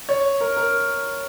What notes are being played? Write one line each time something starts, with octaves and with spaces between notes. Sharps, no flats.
C#5
A#4
A#4